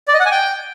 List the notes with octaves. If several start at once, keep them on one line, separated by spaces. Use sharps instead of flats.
D5
D#5
F#5
G#5
G5